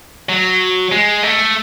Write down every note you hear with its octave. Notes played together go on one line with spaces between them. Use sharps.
F#3
G#3
A3